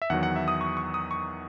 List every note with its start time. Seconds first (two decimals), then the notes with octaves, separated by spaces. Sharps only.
0.02 E5
0.10 E2 D#3 F#3 F#5
0.23 F#5
0.36 E5
0.48 D#6
0.61 C#6
0.77 C#6
0.94 D#6
1.11 C#6